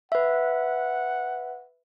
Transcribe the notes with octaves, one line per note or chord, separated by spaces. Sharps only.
B4 E5 F#5